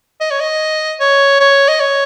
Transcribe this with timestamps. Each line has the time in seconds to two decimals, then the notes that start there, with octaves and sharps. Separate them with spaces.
0.20 D#5
0.31 C#5
0.40 D#5
1.00 C#5
1.40 C#5
1.68 D#5
1.80 C#5